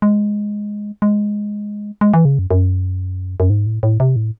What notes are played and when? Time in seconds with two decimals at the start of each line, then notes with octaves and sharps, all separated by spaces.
0.02 G#3
1.02 G#3
2.01 G#3
2.14 E3
2.25 C#3
2.39 F#2
2.51 F#2
3.40 F#2
3.50 G#2
3.66 A2
3.83 A2
4.00 C3
4.16 A2